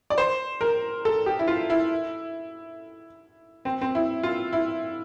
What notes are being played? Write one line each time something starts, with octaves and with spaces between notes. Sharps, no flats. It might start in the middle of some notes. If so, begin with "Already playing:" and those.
D5
C5
A#4
A4
G4
E4
F4
E4
C4
C4
E4
F4
E4